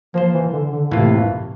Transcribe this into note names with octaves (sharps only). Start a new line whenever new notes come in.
F3 A#3 F4 C5
E3
D3
D3
A2 C3 E3 A#3 F4